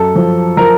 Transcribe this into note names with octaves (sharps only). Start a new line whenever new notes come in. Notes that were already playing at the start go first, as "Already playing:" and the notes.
Already playing: F#2 A4
F3
F3 A#4